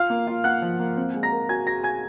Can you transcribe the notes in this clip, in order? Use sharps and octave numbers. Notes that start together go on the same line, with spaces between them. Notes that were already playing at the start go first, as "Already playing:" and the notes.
Already playing: F4 F5 F6
A#3
F4
A#3 F#5 F#6
F3
A#3
C4
G#3
A#5 A#6
A#4
F#4 G#5 G#6
F#4 A#5 A#6
F#4 G#5 G#6